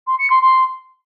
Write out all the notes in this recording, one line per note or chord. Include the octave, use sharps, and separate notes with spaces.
C6
C#7
C6
C6